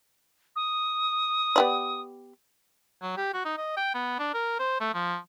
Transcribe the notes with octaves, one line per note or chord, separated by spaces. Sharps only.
D#6
B3 G4 D5
F#3
G4
F#4
D#4
D#5
G5
B3
D4
A#4
C5
A3
F3